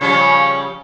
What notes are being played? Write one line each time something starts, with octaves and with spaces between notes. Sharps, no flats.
C#3 F3 G3 C#5